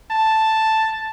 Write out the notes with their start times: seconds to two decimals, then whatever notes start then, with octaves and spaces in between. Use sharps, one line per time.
0.11 A5